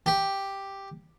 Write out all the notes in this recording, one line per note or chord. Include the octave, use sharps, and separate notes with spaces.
G4